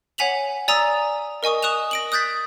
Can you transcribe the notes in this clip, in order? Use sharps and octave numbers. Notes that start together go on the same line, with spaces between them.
C#5 F#5 G#5 B6 F7 F#7
D5 G#5 A#5 D#6 E6
A#4 D#5 G#5 C#6 D#6
C#6 D#6 F#6 E7 F7
A#6 D7 F#7
D#6 F#6 G6 A6 B6